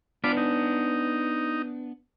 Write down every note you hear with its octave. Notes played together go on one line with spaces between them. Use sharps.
B3 D4 F4 B4 D6
D#4